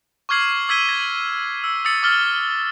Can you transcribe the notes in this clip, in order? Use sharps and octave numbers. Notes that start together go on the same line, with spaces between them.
C#6 D6 F6 G#6 C7 F#7
D6 E6 G#6 B6 D#7 G7
G#6 A#6
E6
D#6 E6 A6 C#7
D6 E6 F6 A6 G7